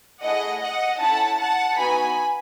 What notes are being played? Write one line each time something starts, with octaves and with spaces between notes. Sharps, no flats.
A3 E4 G#4 D#5 F#5
D#5 F#5
C#4 E4 A4 F#5 A5
F#5 A5
B3 D#4 F#4 G#5 B5